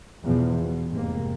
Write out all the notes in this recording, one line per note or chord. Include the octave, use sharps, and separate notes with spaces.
E2 G#2 B2 E3 F3
B2
F1 G#2 C3 A#3